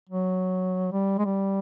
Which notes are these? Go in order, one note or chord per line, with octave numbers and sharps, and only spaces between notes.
F#3
G3
G#3
G3